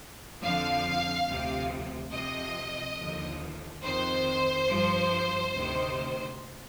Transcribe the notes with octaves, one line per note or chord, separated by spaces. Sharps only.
F2 D3 F3 F5
D2 C3 F3
F2 C3 F3 D#5
D#2 D3 F3
F2 D#3 C5
G2 F3
D2 C3 D#3